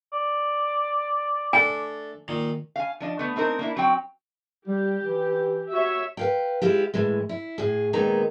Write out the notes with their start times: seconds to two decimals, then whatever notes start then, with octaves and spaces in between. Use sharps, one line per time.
0.13 D5
1.53 A3 D4 E5 G#5
2.28 A#2 D#3
2.76 F5 G#5
3.00 F3 D4 D#5
3.19 A3 B3
3.36 A3 C4 D#4 A#4
3.59 A#3 D4 E4
3.77 F#3 C4 G5
4.67 G3 G4
5.04 E3
5.73 F#4 C#5 E5
6.17 B4 F5 G5
6.62 G#3 E4 F4 G4
6.94 A2 E3 G#3
7.29 E4
7.58 A2 G#4
7.93 A#2 D#3 G#3 B3 D#4 A#5